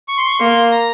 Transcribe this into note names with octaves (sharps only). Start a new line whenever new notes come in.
C#6
C6
C#6
A#3 C6
A#5